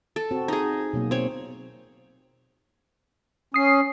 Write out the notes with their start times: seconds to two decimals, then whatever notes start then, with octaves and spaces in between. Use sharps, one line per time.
0.16 A4
0.31 C4 F#4
0.48 D#4 G#4
0.93 B2 F#3 A#3
1.11 C4 C#5
3.54 C#4 D#6 C7